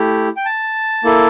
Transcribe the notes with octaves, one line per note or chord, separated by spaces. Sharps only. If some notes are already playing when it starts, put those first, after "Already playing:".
Already playing: A3 E4 G4
G5
A5
A#3 E4 A4